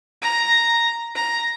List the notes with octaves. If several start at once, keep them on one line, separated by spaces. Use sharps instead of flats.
A#5
A#5